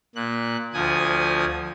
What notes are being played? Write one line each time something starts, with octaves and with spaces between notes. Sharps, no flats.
A#2 F#6
D2 F3 G#5 D#6